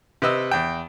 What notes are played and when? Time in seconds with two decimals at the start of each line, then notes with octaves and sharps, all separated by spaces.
0.22 C3 B4 D#5 E6
0.51 E2 G5